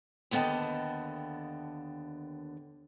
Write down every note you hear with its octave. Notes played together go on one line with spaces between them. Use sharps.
D#2 D3 B3 D#5 G5 A5